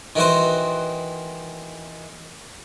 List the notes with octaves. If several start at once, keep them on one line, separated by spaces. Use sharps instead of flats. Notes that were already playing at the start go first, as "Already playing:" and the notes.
D#3 E3 F#4 C5